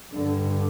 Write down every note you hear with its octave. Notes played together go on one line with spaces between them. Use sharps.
G2 D3